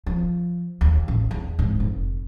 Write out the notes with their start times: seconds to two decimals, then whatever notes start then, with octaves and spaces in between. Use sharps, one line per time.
0.06 F3
0.81 D#2
1.08 A1
1.31 E2
1.59 G#2
1.80 F1